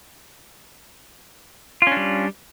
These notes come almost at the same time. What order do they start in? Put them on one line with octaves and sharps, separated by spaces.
F4 C#4 D4 G3